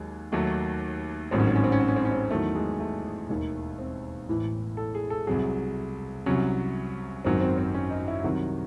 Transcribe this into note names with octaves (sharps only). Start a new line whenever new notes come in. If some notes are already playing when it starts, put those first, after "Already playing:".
Already playing: D#2 F#3 G#3
D#2 D#3 F#3 A3
A1 G#2 D#3 F#3 C4
C#4
C4
C#4
C4
C#4
C4
C#4
C4
C#4
C4
E2 D#3 F#3 A3
G#3
A3
E1 D#2 D#3
C4
A1 A2 E3
A4
G#4
A4
C2 C3 F#3 G#4
C2 C3 F#3 C#4
G#1 F#2 D#3 F#3 C4
C4
C4
C#4
D#4
E4
C2 C3 D#3 F#3 F#4